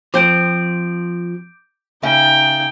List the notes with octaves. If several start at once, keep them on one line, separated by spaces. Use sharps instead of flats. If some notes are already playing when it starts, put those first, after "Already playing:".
F3 C4 D6 G6 D7
C#3 D#4 E5 G5